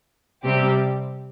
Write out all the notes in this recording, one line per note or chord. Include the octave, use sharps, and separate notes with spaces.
C3 G3 C4 G4